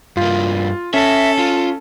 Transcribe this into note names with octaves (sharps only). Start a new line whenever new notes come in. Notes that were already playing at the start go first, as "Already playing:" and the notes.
G2 A#3 F4
C#4 A4 C#5 E5
F4